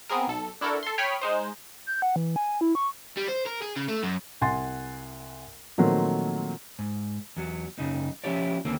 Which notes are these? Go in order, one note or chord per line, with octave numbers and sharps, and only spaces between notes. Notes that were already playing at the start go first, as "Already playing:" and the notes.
B3 C4 G#4 A#4
B1 A4
D4 E4 F#4 A4 A#4
A4 C6
C#5 G5 B5 D#6 F6 B6
G#3 D#4 C5
G6
F#5
E3
G#5
E4
C#6
G3
C5
A#4
G#4
C#3
A3
F#2
C2 F#5 G#5 C6 A6
A#2 D#3 F3 F#3 A3 C4
G#2
E2 F#3
F#2 C#3 D#4
F3 C#4 E4 G4 C#5 D5
D#2 D3 A#3 C4 C#4